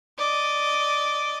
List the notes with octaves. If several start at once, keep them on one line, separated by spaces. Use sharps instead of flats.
D5 D#5